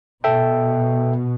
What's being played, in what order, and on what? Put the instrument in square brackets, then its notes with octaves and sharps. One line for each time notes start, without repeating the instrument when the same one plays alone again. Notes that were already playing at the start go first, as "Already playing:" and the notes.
[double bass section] B2 [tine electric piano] A4 E5 G5